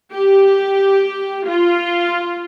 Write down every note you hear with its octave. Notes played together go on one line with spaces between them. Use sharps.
G4
F4